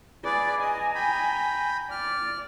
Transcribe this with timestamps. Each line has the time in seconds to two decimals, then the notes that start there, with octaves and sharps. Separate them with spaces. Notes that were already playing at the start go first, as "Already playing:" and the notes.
0.25 G#4 B4 D5
0.61 D#5 G#5 A#5
0.95 G5 B5
1.91 D5 F6